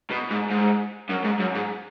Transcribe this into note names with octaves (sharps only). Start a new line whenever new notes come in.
B2
G#2
G#2
F#2
G#2
F#2
G#2